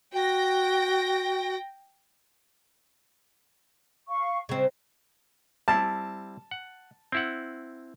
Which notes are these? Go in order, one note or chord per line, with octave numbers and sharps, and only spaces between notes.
F#4 G5 A#6
F5 C#6
C#3 C4 D#5
G3 C4 E4 A5
F#5
C4 E4 F#5